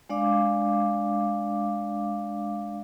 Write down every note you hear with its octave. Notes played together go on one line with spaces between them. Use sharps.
G#3 D4 D5 F5 D6